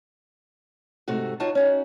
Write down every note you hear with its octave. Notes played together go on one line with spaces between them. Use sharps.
G#2 C3 A3 F#4
D#4 F4 F#4 C#5 A5
C#4 D#4 F#4